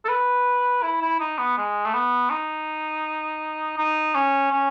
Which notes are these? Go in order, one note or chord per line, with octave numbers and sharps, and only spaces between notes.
A4
B4
E4
E4
D#4
B3
G#3
A3
B3
D#4
D#4
C#4
C#4